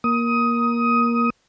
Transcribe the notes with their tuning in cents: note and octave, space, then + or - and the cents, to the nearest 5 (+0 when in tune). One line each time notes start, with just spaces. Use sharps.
A#3 +15 D#6 +15